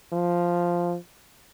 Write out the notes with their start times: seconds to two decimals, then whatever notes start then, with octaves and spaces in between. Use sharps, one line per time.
0.13 F3